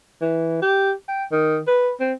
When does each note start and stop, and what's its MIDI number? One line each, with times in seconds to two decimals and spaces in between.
0.22 0.58 52
0.62 0.92 67
1.08 1.24 79
1.32 1.60 51
1.67 1.91 71
2.00 2.13 60